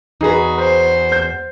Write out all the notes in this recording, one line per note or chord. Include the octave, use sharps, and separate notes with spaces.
E2 D#4 F#4 G#4 B4
C5
G6